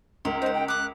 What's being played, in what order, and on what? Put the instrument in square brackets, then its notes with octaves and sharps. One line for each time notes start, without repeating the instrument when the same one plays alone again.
[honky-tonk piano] C#2 A#4 [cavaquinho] C6
[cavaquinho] D#4 F#5 [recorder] C5
[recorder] G5
[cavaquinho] D6 D#6 [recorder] F#6